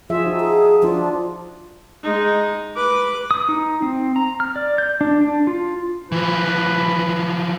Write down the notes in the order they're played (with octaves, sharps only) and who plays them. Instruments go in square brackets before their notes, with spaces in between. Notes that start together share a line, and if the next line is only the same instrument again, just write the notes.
[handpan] F3 G#4 E5 [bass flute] F4
[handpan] D#4 F#4
[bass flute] G#4
[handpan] F3 D4 [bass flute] F4
[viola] G#3 D#4
B4 D6
[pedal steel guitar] D#6
D#4
C4
A#5
F6
D5
G6
D4
D4
F4
[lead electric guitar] E3 F3 [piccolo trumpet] B4